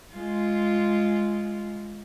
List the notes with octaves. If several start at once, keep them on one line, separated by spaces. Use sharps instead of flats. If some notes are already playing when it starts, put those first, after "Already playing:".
G#3 F4